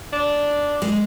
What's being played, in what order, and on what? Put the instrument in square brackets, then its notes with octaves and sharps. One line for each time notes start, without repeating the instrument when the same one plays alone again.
[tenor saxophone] D4
[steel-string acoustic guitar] G#3